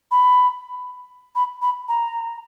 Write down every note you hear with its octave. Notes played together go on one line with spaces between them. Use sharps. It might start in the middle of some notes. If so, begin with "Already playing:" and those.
B5
B5
B5
A#5